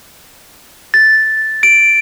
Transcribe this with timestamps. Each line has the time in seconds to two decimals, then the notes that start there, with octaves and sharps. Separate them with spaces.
0.94 A6
1.63 D7